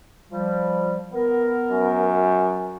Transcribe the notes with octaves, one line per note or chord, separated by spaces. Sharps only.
F3 G3
B3 A#4
F#2